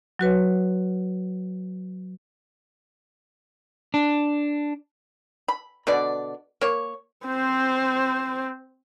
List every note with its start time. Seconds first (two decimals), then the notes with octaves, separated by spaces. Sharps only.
0.19 F#3 F#4 B4 C#5
3.94 D4
5.48 B5
5.87 B2 D3 B4 D5
6.61 A#3 C#5
7.26 C4 C5